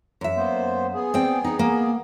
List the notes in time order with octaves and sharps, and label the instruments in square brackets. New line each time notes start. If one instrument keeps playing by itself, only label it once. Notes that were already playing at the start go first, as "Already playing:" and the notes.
[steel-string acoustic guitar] F#2 E5
[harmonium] A#3 B3 C5
B3 G#4
[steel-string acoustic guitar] C4 D5 G5
D#4 F#5
A#3